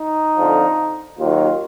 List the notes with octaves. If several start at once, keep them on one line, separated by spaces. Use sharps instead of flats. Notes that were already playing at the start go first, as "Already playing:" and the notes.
Already playing: D#4
F2 D3 F3
D#2 D#3 F#3 F4